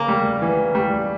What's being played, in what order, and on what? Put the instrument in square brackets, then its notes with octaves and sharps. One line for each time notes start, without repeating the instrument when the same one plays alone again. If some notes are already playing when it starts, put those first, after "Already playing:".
Already playing: [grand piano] C#3 [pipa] A#3
[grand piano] G3
E3
G3